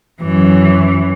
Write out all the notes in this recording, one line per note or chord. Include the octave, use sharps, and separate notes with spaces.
F#2 E3